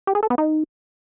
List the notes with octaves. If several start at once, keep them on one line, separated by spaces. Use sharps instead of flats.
G4
G#4
A4
B3
D#4